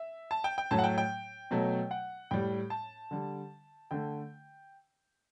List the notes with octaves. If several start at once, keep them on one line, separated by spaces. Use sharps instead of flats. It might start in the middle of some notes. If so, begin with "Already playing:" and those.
Already playing: E5
A5
G5
G5
A2 F#3 A3 A5
F#5
G5
G5
B2 F#3 A3
F#5
A2 G3 G5
A5
D3 G3
D3 A3 G5